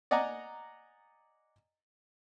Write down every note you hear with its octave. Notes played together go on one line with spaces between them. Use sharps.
D5 D#5 F#5 G#5 A#5